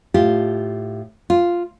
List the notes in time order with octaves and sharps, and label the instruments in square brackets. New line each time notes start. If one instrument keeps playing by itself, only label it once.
[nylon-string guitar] A2 F4 G4
F4